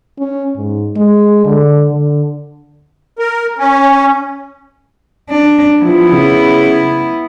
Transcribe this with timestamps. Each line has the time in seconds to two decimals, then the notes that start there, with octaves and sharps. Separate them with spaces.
0.19 C#4
0.56 G#2
0.96 G#3
1.45 D3
1.91 D3
3.19 A#4
3.58 C#4
5.30 D4
5.83 F3 B3 E4
6.12 C#3